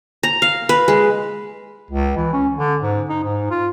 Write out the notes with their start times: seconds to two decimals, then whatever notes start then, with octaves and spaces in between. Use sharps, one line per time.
0.23 A#5
0.42 F5
0.69 B4
0.88 G#3
1.91 C#2
2.17 E3
2.33 C#4
2.57 D3
2.82 G#2
3.09 D#4
3.24 G#2
3.50 F4